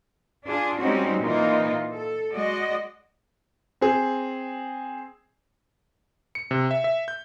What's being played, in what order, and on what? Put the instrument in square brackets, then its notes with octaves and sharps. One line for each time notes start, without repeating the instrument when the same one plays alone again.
[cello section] D4 F4 G#4
G3 G#3 C4 C#4 D#4 F#4
A#2 E3 A#3 D#4 F4
A4
G#3 F#4 D5 D#5
[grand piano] C4 G#4
[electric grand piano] C#7
C3
E5
E5
G6